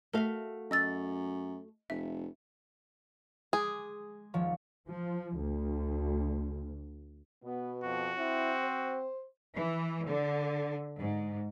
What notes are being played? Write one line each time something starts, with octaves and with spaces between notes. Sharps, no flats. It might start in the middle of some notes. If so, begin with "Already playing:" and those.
A3 F#4 A#4 E5 F5
F#2 D#5 E6 A6
F1 E5
G#3 G#4 D6
D#1 F3 C#5
F3
D2
B2 B3
F2 F#4
C4 E4
C5
E3
D3
G#2